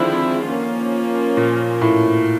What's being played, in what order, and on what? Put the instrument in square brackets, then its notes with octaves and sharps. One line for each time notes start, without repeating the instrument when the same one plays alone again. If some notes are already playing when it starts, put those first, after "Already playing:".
Already playing: [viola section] D3 F3 G#3 C4 E4 [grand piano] D#3
[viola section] F3 A#3 C#4 F4
[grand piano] A#2
A2